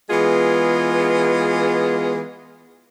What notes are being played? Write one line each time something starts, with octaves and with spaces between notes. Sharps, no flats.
E3 G#3 B3 F4 G#4